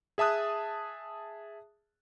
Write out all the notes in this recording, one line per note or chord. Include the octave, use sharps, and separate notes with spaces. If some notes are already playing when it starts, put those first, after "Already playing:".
G#4 E5 A5 D#6 F#6